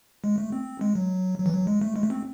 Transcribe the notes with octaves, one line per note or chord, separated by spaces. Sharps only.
G#3
A3
C4
G#3
F#3
F#3
E3
F#3
G#3
A3
G#3
A3
C4